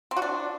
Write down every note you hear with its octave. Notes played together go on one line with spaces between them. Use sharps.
C4
F#4
D4